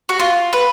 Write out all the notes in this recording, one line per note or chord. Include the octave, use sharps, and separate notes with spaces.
F#4
F4
B4